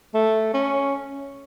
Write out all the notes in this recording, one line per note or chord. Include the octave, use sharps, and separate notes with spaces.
A3
C#4